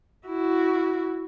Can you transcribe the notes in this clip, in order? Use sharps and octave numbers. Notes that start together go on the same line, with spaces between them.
E4 F#4